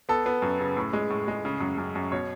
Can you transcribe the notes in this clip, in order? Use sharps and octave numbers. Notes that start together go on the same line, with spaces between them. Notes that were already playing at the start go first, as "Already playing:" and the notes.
B3 A4
B3
F#2
C#3
A2
G#3
A2
G#3
C#3
F#2
F#2
F#2
B2 C#5